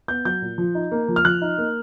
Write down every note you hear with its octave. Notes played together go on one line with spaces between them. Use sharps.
B3 G6
F#3 G6
A#2
F3
D#4
A#3
F3
F6
F3 F#6
D#4
A#3